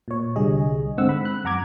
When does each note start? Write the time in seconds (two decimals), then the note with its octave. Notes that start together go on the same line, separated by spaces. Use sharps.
0.08 A#2 C#5
0.36 C2 D3 G3 G#4 D#5
0.98 G#2 D3 C4 F#5 E6
1.09 B5
1.25 F#6
1.44 F#2 F#5 A#5 D6 G#6